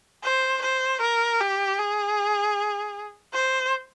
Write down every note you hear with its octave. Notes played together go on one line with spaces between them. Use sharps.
C5
C5
A#4
G4
G#4
C5